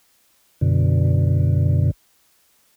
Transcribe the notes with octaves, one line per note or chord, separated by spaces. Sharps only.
F#2 B2 D3